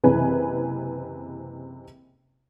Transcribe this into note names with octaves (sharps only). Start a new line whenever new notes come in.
F#1 C3 E3 B4 G#5